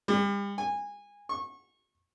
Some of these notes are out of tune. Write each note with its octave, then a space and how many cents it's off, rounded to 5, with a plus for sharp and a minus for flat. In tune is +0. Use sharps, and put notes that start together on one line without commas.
G3 +40
G#5 -20
C#6 -30